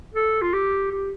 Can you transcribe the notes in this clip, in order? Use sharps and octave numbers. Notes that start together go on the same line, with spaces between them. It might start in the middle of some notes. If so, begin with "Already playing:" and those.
A4
F4
G4
G4